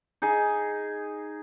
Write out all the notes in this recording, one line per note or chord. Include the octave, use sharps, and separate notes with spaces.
D#4 G#4